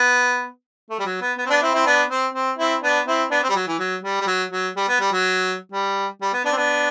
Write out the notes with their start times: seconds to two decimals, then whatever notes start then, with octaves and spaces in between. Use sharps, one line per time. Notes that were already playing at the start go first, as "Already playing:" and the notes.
Already playing: B3
0.90 A3
0.99 G3
1.06 F#3
1.21 B3
1.38 B3
1.46 C4
1.50 B3 D4
1.62 C4 E4
1.74 C4 E4
1.86 B3 D4
2.10 C4
2.34 C4
2.58 C4 E4
2.82 B3 D4
3.07 C4 E4
3.30 B3 D4
3.43 C4
3.49 G3
3.56 F#3
3.67 E3
3.79 F#3
4.03 G3
4.21 G3
4.27 F#3
4.52 F#3
4.76 G3
4.88 B3
5.00 G3
5.12 F#3
5.72 G3
6.21 G3
6.33 B3
6.45 B3 D4
6.52 C4
6.57 B3 D4